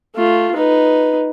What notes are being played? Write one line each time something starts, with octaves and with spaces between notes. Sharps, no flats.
A3 F4
D#4 B4